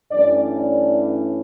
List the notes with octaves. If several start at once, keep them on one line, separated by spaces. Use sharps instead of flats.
G2 E3 A3 C#4 D5
D5